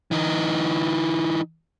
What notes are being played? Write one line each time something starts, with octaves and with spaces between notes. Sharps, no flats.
E3 D#4